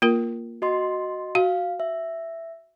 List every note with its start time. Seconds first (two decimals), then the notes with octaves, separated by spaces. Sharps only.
0.02 A#3 F4 A#4
0.62 F#4 D#5 C6
1.35 F#4 F5
1.80 E5